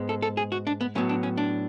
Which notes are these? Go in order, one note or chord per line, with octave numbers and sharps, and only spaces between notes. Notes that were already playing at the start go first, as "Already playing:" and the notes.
Already playing: G#2 G#3 B3
A4
A4
G#4
F#4
D4
B3
A2 F#3 B3 C#4
D4
C#4
D4